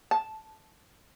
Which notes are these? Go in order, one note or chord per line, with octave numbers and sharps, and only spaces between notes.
A5